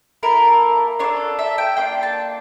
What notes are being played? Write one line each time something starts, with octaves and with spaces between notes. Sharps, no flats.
A#3 E4 A4 A#4
D4 F4 A4 C#5
E5
G5
A#3 D4 F4 G5
A5